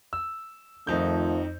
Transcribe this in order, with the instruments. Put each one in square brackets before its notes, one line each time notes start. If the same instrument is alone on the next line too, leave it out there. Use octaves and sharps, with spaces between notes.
[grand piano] E6
[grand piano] F2 D#4 G6 [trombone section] D#3 F3 A3